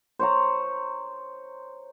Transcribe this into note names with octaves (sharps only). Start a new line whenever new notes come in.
C5 C#5 A#5